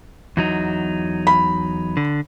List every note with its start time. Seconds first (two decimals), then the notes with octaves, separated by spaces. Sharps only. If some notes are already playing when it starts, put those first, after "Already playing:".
0.37 E2 F#3 D#4
1.27 B5
1.97 D3